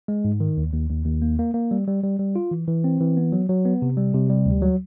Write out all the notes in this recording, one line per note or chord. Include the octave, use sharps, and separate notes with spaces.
G#3
G#2
D#3
D#2
D#2
D#2
D#2
A#3
A#3
A#3
G3
G3
G3
G3
F4
E3
E3
C4
E3
B3
F#3
F#3
B3
C3
G3
C3
G3
D2
F#3